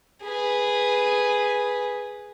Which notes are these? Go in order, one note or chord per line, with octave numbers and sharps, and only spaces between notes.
G#4 B4